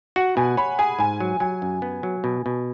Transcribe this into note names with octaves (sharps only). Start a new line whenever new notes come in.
F#4 F#5
B2 G#5
C#5 B5
G#4 G#5
G#2 G#5
F#3
F#3 G#5
F#2
B3
F#3
B2
B2